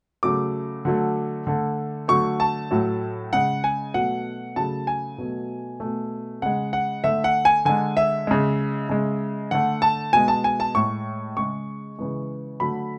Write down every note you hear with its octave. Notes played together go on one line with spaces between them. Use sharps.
C#3 F#3 A3 D6
D3 F#3 A3
D3 A3
D3 F#3 A3 C#6
A5
A2 F#3 A3
C#3 G#3 F#5
G#5
B2 F#3 A3 F#5
C#3 F#3 A3 A5
G#5
B2 F#3 A3
B2 A3
C#3 G#3 F#5
F#5
D3 A3 E5
F#5
G#5
D3 G#3 G#5
E5
C#3 G#3
C#3 G#3
D3 A3 F#5
A5
B2 G#3 G#5
A5
G#5
A5
A2 G#3 C#6
C#3 G#3 C#6
C#3 E3 G#3
D3 F#3 A3 B5